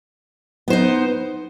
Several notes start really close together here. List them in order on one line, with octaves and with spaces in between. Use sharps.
B3 C5 D#4